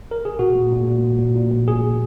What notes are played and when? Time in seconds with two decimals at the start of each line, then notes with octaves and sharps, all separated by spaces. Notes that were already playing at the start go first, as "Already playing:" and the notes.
0.11 A#4
0.25 G#4
0.39 A#2 F#4
0.56 A#2
0.71 A#2
0.87 A#2
1.03 A#2
1.19 A#2
1.35 A#2
1.52 A#2
1.68 A#2 G#4
1.83 A#2